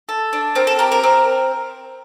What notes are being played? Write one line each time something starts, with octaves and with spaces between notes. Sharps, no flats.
A4
D4
C4 A#4
A4
G4 A#4
A#4
C4